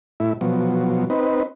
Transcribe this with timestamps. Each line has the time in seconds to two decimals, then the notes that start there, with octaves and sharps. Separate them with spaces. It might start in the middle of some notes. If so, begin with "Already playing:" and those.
0.20 A2 E4
0.41 B2 F3 F#3
1.10 C4 D#4 B4